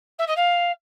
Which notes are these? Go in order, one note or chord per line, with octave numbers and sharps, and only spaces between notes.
E5
D#5
F5